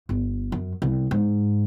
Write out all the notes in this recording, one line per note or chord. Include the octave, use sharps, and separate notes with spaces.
G1
F#2
C2
G#2